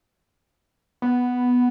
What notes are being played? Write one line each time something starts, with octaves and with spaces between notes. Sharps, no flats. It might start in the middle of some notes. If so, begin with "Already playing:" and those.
B3